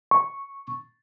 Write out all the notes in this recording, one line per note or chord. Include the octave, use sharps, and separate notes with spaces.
C#6